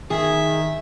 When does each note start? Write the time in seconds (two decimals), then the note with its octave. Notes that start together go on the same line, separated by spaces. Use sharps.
0.10 D#3 G#4 E5